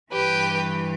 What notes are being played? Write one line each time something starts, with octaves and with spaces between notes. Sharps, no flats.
G2 E3 G4 B4